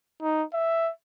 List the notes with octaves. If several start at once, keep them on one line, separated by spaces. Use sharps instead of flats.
D#4
E5